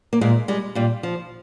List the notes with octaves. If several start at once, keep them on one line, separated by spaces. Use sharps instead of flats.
A#3
A#2 G#3
G3 G#3
A#2 G3
F3